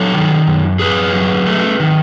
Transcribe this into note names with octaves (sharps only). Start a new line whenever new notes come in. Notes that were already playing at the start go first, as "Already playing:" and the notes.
Already playing: F#3 A4 C#5
D#3
F#2
F#2 G#4 B4
F#3
A3
D#3